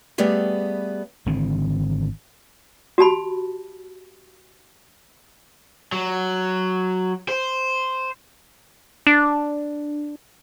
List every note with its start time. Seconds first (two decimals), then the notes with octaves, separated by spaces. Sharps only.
0.18 G3 A3 B3 G4 G#4
1.26 G#1 D3 E3 C4
2.98 F#4 G4 A5 B5
5.92 F#3
7.28 C5
9.07 D4